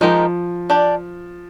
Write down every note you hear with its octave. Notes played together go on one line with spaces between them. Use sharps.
D#3 F3 G#3 D#4 G4 A#4
D4 G4 D5